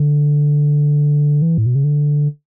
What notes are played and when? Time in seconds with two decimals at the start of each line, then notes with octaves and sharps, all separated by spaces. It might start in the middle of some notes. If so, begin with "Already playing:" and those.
Already playing: D3
1.42 E3
1.58 A2
1.66 B2
1.75 C#3
1.84 D3